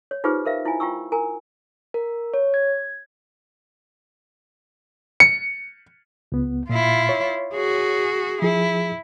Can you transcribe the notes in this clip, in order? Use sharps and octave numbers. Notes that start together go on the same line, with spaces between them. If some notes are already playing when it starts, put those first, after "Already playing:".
C#5
D#4 F4 G4 G#4 B4 C5
A#4 C5 E5 F5
E4 F4 G#5
F4 G5 A#5 C#6 E6
A#4 G#5 A#5
A#4
C#5
G#6
C#7
C#2 B3
A#2 E4 F4
C#5
F#4 G#4
F3 E4 G#4